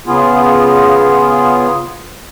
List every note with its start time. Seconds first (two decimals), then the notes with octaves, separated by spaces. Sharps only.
0.07 C#3 B3 F4 G#4